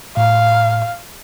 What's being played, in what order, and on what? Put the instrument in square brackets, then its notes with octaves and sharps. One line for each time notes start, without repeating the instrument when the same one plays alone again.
[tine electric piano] A2 [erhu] F5